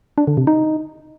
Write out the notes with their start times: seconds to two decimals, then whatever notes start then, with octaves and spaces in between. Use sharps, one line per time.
0.18 D4
0.27 D3
0.37 C3
0.47 D#4